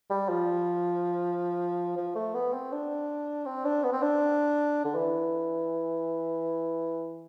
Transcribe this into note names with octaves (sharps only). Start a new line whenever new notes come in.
G3
F3
F3
A3
B3
C4
D4
C4
D4
B3
C4
D4
D3
E3